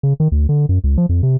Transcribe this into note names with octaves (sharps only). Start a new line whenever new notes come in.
C#3
D#3
D2
D3
F#2
C#2
F3
F2
C3